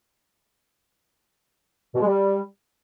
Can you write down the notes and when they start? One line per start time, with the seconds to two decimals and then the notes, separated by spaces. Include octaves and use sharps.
1.95 B2
2.01 G#3
2.07 G3